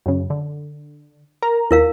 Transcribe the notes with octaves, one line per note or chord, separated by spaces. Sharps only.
F#2 C#3
D3
A#4 A#5
D#2 E4 A#4 F5